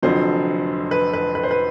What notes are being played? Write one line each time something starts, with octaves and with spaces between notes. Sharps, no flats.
F1 F2 D3 F#3 C5
B4
B4
B4
C5
B4